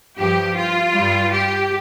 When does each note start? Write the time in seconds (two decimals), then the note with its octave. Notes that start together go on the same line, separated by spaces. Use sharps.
0.18 G2 F3 G4
0.56 F4
0.94 G2 G3
1.33 G4